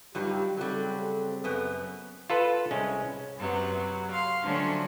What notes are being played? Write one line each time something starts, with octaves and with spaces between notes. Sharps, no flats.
G2 F#3 G3 D#4 F4 G4
C#3 F#3 G3 C4 A4
F#2 B3
F4 A4 B4
C2 G#3 C#4
F#2 C3 F#3 B3
F#3
F5 C6
D3 F3 F#3 A3 C#4 D4